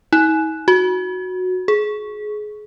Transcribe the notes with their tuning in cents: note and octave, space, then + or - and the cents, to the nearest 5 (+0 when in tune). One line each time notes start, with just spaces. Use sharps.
D#4 +45
F#4 -10
G#4 +25